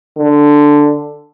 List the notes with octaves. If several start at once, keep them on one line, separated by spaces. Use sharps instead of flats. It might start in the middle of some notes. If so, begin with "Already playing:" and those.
D3